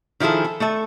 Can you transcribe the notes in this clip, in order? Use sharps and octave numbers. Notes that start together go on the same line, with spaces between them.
D#3 F3 E4 G#4 A4
A4
A3 A4 E5